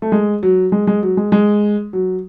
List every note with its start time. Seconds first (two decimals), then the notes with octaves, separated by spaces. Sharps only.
0.02 A3
0.12 G#3
0.43 F#3
0.72 G#3
0.87 G#3
1.03 F#3
1.17 G#3
1.32 G#3
1.93 F#3